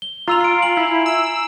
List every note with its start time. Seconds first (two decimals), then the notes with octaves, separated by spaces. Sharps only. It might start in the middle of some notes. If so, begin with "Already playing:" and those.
0.02 G7
0.28 F4 A#5 E6 F7
0.41 C7 D7
0.62 G#5 D7 F#7
0.77 E4
1.06 E6